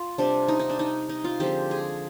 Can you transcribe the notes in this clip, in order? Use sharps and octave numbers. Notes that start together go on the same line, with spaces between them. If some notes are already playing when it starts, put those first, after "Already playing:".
Already playing: F4
C3 G3 C4 D4
D#4
D#4
D4
D#4
D#4
F4
D3 F3 G#3 C4 G4
G#4